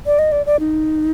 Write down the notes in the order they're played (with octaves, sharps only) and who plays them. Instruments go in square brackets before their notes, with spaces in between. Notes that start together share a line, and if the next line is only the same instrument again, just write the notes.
[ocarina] D5
D#5
D5
D5
D#4